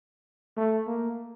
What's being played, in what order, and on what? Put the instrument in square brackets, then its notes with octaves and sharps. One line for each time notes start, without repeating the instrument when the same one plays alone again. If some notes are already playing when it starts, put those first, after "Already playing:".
[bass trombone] A3
A#3